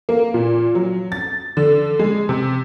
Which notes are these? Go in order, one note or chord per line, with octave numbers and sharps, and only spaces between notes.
A#3
A#2
F#3
A6
D3
G#3
C3